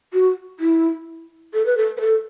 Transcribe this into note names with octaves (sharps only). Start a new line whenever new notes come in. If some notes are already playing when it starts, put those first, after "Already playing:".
F#4
E4
A4
B4
A4
B4
A4